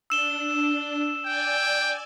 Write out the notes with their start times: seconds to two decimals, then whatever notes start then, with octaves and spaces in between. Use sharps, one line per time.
0.10 D4 E6 E7 G7
1.25 D5 G5 G#5